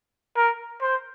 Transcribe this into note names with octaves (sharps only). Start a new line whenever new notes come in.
A#4
C5